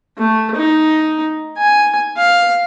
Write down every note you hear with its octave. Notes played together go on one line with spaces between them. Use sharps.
A3
D#4
G#5
F5